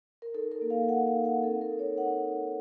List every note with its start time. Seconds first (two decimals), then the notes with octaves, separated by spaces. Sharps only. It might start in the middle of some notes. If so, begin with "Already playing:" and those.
0.22 A#4
0.34 D#4 A4
0.52 A#4
0.62 A#3
0.70 F5
0.84 F5
0.89 A#3 F#5
1.07 F5
1.15 D#4
1.25 F#5
1.43 C4 A4
1.61 A#4
1.71 D#4
1.79 C#5
1.98 D#4 F#5
2.25 D#4